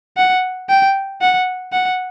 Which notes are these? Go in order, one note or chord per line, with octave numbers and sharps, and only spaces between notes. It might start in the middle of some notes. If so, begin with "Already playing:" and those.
F#5
G5
F#5
F#5